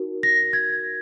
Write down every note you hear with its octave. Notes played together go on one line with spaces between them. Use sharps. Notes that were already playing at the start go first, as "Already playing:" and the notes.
Already playing: D#4 F#4 A#4
A#6
G#6